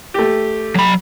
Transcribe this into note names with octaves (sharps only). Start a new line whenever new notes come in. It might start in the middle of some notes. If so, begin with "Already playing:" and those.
A3 G4
F#3 B5